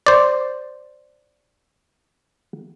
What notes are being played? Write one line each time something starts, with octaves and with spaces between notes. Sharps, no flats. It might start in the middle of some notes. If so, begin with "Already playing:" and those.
C5 D5